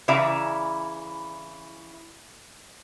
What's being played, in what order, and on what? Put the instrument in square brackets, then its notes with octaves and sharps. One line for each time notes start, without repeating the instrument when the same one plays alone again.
[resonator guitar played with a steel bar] C#3 E3 E4 D5 E5 A#5